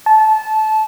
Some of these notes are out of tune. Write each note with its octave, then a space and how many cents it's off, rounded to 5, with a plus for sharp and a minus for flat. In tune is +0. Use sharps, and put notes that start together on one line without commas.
A5 -20